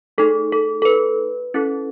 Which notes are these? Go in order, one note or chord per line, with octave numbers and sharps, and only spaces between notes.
A3 D#4 G#4 A4
A4
A4
B4
C#4 E4 A4